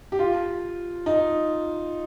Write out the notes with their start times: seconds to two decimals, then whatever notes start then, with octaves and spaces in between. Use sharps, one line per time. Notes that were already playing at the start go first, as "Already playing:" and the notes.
0.12 G4
0.19 F4
1.06 D#4